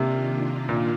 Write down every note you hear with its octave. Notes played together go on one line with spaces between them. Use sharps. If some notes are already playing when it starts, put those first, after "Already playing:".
Already playing: C3 D#3 A#3 D4 F4
A#2